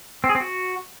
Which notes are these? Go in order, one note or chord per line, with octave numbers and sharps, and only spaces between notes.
C4
G#4
C4
F#4